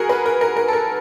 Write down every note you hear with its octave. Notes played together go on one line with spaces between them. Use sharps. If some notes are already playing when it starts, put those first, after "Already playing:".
Already playing: F#4 G#4 A#4
B4
A#4
A#4
A#4
A4
A#4